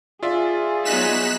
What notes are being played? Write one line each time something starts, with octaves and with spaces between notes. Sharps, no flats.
F4 G#4 D5 E5
F#3 B3 D#4 F#6 B6 E7